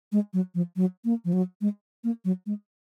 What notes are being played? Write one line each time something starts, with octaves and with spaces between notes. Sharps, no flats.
G#3
F#3
F3
F#3
A#3
F3
F#3
G#3
A#3
F#3
G#3